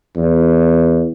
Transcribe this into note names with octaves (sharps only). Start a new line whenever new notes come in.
E2